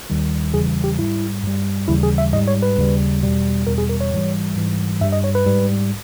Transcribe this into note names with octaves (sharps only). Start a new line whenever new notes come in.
D#2 D#3 G3
E2 C#3 E3 G3 G#4
G4
G#2 G3 E4
G2 G3
D#2 C#3 E3 G3 E4
G#4
E5
G#2 G3 D#5
C#5
B4
D#2 C#3 G3
E2 B2 G3
E2 B2 G3 A#4
G#4
A#4
C#5
G#2 E3 G3
G#2 E3 G3
G2 G3 E5
D#5
C#5
B4
G#2 G3